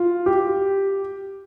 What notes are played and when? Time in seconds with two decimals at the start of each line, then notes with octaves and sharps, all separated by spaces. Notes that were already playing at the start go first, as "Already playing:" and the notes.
Already playing: F4
0.26 G4